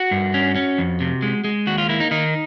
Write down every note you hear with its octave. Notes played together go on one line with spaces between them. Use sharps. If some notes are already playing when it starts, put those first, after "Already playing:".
Already playing: F#4
G2
C#4
C#4
F2
C3
G#3
G#3
D#2 F#4
F4
A#3 E4
D#4
D#3 D#4